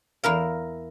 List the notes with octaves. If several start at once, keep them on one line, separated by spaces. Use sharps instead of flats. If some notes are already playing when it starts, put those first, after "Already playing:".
E2 E4 A#4 F5